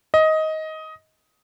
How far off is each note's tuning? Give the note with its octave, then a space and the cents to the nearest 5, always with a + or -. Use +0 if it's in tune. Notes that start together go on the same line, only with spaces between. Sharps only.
D#5 +15